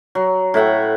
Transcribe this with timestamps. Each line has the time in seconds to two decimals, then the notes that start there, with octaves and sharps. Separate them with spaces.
0.15 F#3
0.54 A2 E5 F#5 G5